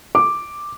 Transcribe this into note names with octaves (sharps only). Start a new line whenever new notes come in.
D6